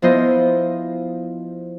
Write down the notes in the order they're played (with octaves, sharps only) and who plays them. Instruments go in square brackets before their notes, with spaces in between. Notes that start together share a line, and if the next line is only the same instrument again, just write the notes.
[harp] F3 B3 E4 F4 C5 D#5